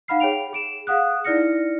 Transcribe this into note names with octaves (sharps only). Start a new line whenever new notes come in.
D#4 F5 F#5 B5 F6 C7
G#4 C#5 G5 D7 F7
G#4 D7 E7
G#4 F5 F#5 D#6 F#6
D#4 E4 D5 F6 A#6 C#7